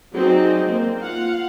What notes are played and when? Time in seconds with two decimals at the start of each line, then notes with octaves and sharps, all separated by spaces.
0.13 F#3 C4 D#4 G#4 D5 D#5
0.69 A#3 C4
1.01 F4 F5 F#5